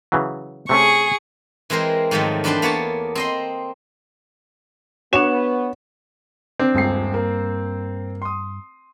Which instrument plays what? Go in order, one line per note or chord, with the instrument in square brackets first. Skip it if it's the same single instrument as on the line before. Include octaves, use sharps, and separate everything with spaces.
[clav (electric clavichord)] C#3 E3 F#3
[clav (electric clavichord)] C3 A3 C#4 [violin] G#4 C#6
[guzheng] E3 G#3 C4 A#4 C5
G#2 D#3 F3 F#3 A3
E2 D4 B4 C5 G5 A5
A#3 B3 C#5 A5
C4 D#5 C6
[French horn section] B3 [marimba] D4 F#4 [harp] C#5 F#5 C#6 [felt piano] E7
[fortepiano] C4 [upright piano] D4
[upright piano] D#1 C#2 C7 [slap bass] G2
[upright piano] A#3
C6 D#6